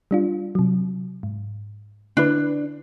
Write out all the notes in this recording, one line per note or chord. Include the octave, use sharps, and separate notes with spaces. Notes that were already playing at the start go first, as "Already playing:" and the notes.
G3 D4 F4
C3 F#3
G#2
D3 D4 E4 B4